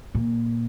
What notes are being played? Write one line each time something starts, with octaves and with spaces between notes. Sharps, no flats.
A#2